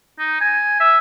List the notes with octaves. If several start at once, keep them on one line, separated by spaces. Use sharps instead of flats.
D#4
G#5
E5